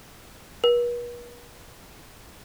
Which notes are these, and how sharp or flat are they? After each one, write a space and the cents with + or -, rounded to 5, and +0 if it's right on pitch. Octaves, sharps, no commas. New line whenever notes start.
B4 -45